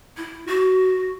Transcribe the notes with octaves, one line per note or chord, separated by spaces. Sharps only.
E4
F#4